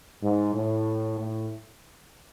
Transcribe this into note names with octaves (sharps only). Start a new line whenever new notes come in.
G#2
A2
A2